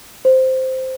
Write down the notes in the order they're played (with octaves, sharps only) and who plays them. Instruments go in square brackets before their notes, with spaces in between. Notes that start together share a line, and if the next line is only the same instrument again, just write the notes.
[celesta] C5